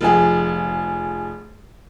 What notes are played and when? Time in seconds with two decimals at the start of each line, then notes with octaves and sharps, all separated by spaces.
0.01 F1 F3 G#4